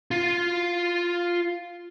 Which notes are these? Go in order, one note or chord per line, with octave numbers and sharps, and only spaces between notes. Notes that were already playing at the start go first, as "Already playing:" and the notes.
F4